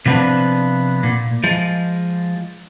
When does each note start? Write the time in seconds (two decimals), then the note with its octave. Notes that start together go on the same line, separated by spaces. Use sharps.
0.06 C3 F3 B3 C4 D4
1.03 A#2
1.44 F3 G#3